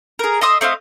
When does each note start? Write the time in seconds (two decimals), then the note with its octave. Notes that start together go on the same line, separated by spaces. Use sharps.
0.19 G#4 A#4
0.41 D#5 E5 C6 D#6
0.61 A3 C4 D#5 F5